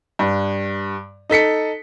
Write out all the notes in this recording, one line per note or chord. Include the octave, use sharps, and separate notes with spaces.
G2
D#4 A4 B6 C#7